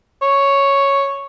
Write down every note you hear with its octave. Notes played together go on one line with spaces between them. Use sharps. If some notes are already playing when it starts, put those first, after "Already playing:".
C#5